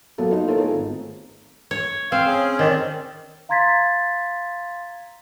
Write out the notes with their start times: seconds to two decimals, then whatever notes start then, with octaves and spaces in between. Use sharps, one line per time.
0.18 F#3 A#3 B3 A4 B4
0.31 D#4 F4
0.47 E4 F4 A4 A#4 C#5
0.58 A3 B3 D#4 G#4 A#4
0.73 G#1
1.71 C#5
2.12 C4 F5
2.26 C#4 G#4
2.59 D#3 C4 C#4 D5
3.49 F5 A#5 C6 G#6 A6 B6